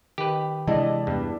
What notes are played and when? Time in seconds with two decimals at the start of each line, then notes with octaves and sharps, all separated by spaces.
0.18 D#3 G4 B4
0.67 C3 E3 G#3 D4 E4 D#5 A5
1.07 E2 G2